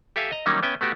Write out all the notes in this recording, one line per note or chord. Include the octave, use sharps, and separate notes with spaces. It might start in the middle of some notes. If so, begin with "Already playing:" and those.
G4 A4 E5 F5 G#5
D#5 A#5
D#3 F#3 G3 A#3 C#4 D#4
B3 C#4 E5 G5 G#5
A3 B3 F#4 G4